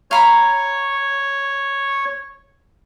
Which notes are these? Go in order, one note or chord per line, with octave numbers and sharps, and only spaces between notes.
C#5 F5 A#5 B5